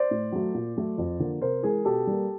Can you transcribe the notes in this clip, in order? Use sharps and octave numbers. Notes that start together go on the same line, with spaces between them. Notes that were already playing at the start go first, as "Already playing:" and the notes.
Already playing: C5 D5
A2
F#3 A3
A#2
F#3 A3
F2
D3 F3 A#3
C3 A#4 C5
E3 G#3 G#4 A#4
B2 G4 A4
G3 A#3